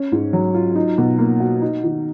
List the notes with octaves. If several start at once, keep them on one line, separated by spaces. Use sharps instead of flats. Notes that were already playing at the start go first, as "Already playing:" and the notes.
Already playing: C#4
G#2
F#3
F4
D#4
B2
A#3
F#4
D#4
D#3